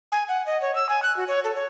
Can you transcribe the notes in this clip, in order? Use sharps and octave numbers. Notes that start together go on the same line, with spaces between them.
G#5
F#5
D#5
C#5
E6
G#5
F#6
F#4
C#5
A4
C#5